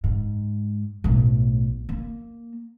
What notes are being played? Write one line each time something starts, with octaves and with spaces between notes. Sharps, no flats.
G#2
B1 A2
A#3